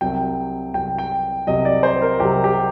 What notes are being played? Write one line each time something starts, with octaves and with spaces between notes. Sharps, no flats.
C2 C3 F#3 G5
C2 C3 F#3 G5
G5
C2 C3 F#3 D#5
D5
C5
A#4
C2 C3 F#3 G4
G4